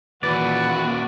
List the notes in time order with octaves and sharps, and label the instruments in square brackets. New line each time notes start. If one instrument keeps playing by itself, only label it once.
[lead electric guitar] D#2 A#2 [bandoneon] E3 B4 F#6 [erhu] F#4 [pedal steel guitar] D5